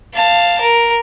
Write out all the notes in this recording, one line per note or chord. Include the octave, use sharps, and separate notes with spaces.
F5 A5
A#4